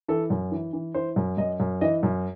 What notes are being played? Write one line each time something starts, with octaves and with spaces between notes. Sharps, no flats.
E3 A4
F#2
E3
E3
E3 C5
F#2
F#2 D#5
F#2
E3 D#5
F#2